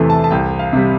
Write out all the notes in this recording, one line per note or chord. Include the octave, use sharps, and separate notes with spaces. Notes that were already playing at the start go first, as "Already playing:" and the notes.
Already playing: E2 C3 E3 A3
A5
A5
C2 G5
F5
C3 G3